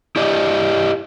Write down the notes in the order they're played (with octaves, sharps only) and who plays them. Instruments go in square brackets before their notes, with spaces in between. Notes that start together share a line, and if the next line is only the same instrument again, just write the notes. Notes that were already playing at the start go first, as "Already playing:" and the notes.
[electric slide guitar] E4 G4 D5 D#5